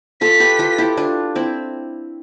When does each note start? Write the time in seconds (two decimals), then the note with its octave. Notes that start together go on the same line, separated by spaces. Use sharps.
0.21 F4 A4 B6
0.40 G4 B4
0.59 F4 A4
0.78 E4 G4
0.97 D4 F4
1.35 C4 E4